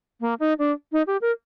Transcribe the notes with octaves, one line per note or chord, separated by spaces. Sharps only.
A#3
D#4
D4
D#4
G4
A#4